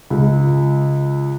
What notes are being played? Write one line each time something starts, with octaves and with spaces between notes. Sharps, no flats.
C#2